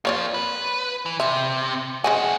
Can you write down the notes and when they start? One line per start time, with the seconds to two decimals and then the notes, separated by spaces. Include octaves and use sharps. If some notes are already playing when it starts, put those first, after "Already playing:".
0.05 A#3 C4 F4 C#5 D5
0.34 B4
1.06 E3
1.20 C3 E5
2.04 F2 G#3 C#4 F#4 G#5